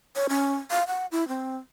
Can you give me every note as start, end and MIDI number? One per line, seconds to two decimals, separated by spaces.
0.16 0.27 73
0.29 0.55 61
0.71 0.84 77
0.87 1.06 78
1.12 1.27 64
1.28 1.57 60